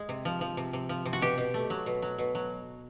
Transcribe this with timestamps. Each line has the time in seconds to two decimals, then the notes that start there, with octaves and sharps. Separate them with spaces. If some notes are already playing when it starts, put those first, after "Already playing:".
Already playing: G#3
0.09 C3
0.25 F3
0.41 F3
0.57 C3
0.73 C3
0.89 F3
1.05 C3
1.13 F#4
1.22 B2 G4
1.38 B2
1.54 A3
1.70 F#3
1.86 B2
2.02 F#3
2.18 B2
2.35 F#3